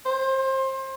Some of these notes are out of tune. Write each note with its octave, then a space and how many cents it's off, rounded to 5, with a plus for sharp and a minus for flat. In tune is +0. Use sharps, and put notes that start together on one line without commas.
C5 +25